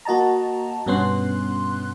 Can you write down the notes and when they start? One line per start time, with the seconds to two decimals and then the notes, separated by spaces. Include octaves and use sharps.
0.05 A#3 F#4 D#5 A5 A#5
0.86 G2 B2 B3 C#4 C6 F#6